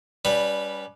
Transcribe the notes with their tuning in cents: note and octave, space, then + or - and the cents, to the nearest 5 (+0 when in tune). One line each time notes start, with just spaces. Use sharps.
G3 +0 C#4 +30 B4 +0